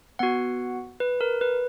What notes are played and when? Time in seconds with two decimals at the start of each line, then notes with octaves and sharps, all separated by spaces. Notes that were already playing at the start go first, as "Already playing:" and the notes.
0.19 B3 F#4 F#5
1.00 B4
1.21 A#4
1.41 B4